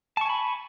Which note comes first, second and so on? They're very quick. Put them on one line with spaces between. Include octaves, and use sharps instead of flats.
A5 C#6 G#5 B5